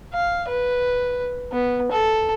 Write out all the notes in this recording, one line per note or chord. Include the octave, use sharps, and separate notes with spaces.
F5
B4
B3
A4